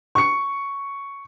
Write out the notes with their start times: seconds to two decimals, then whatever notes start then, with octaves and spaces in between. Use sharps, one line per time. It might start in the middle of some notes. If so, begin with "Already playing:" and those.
0.15 C#6 C#7